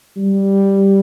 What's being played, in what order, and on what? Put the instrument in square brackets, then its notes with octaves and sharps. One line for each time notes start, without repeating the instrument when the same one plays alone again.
[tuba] G3